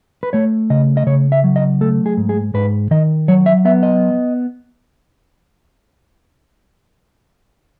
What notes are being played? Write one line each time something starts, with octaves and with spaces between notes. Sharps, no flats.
B4
A3 C#5
C#3 D#5
D#5
C#3 C#5
E5
F#3
D#5
A3 A4
G#4
G#2
G#4
G#2 B4
D#3 D#5
F#3 C#5
E5
B3 E5
D#5